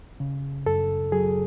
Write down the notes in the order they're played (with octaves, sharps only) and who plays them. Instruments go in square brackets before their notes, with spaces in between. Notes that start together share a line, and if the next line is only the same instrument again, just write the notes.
[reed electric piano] C#3
F#2 A4
F#3 G#4